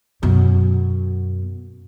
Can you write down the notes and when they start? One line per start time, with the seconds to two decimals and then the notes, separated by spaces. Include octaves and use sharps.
0.23 F#2 B2